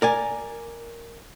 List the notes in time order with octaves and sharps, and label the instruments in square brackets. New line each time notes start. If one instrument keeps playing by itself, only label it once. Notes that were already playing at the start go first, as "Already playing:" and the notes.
[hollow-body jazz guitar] A#4 D5 G#5